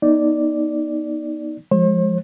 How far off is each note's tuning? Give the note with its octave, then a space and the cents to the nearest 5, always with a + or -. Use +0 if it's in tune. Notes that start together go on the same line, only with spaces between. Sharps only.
B3 -30 D#4 +0 D5 -5
F3 +0 G#3 +0 C5 +45